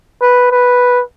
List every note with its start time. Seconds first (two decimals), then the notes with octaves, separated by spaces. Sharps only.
0.21 B4
0.51 B4